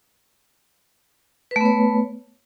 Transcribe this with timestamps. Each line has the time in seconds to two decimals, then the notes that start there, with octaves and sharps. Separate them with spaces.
1.51 B4
1.56 A3
1.61 B3
1.65 C#5